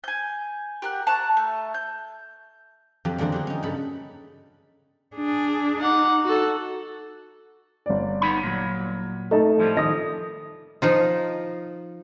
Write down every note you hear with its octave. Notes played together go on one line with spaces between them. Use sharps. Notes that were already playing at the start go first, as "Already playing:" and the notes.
G#5 G6
G4 A#4 F#5
A5 A#5 C#6 F#6
A3
G6
F2 F3 F#3 G4
E2 D3 G3 A#3 C4
F#3 G4 G#4
C#4 D#4
G2 C#3 A4 B5
D4 G#4
D#4 F#5 D6
F#4 A4
G1 D5
B3 D#4 B5
A#2 F#3
A3 D#4 A4 A5
A2 F3 G3
D#3 D#5 D#6 A#6
F3 D#4 F4